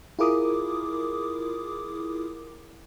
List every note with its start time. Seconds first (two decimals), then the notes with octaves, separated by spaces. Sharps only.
0.19 E4 F4 G#4 A#4 D6 D#6